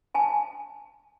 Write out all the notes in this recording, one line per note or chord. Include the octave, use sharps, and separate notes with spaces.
G#5 A5